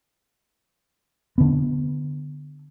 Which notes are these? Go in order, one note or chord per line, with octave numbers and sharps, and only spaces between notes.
D3 B3